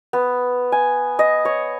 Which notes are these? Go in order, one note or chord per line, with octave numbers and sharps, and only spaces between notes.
B3
G#5
D#5
C#5